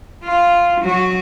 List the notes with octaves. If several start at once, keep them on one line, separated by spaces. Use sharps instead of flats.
F4
F#3 F#4